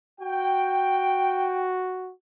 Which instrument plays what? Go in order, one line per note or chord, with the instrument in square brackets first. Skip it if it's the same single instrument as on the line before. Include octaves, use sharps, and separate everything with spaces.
[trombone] F#4 [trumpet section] G5